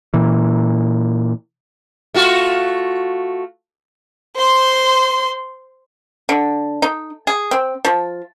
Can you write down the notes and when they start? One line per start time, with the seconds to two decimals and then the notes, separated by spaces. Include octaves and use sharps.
0.14 A#2 E3
2.14 A3 F4 F#4
4.36 C5 C6
6.29 D3
6.82 D#4
7.27 G#4
7.51 C4
7.85 F3